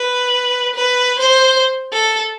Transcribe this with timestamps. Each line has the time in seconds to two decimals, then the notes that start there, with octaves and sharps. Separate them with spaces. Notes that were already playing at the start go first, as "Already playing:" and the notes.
Already playing: B4
0.75 B4
1.19 C5
1.92 A4